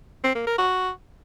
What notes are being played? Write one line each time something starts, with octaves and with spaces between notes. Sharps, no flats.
C4
A#3
A#4
F#4